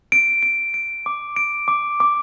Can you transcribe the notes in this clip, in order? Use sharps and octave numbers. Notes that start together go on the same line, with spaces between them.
D7
D7
D7
D6
D7
D6
D6